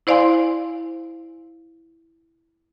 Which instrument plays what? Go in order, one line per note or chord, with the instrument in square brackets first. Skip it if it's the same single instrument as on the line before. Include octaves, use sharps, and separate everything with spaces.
[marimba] E4 C5 D5 F5 G#5 C6